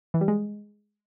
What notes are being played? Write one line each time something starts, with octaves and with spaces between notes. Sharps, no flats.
E3
G3
G#3